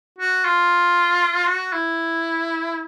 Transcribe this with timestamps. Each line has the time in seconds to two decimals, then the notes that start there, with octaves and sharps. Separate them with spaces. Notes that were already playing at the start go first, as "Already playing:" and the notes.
0.18 F#4
0.45 F4
1.48 F#4
1.73 E4